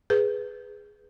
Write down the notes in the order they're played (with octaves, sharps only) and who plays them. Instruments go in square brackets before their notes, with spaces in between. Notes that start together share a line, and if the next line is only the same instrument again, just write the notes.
[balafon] G#4 B4